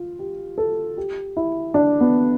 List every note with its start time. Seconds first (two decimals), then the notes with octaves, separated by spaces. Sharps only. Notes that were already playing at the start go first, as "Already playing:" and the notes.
Already playing: F4
0.19 G4
0.58 A4
0.97 G4
1.37 E4
1.74 D4
2.00 B3